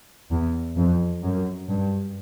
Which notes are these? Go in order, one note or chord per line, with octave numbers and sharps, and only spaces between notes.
E2
F2
F#2
G2